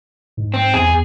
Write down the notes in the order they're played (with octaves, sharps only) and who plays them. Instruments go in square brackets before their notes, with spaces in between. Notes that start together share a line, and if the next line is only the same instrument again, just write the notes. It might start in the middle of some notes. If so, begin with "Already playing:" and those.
[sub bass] G#2
[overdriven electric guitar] C4
[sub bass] E2 [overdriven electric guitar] G#4
[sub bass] E2